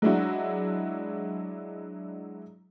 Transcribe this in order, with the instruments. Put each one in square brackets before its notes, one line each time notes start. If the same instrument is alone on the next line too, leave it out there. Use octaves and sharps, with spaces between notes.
[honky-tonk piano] F#3 G#3 D4 E4 F#4